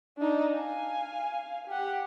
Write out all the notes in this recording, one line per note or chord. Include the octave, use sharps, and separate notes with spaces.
D4 D#4
F5 G#5
G4 F#5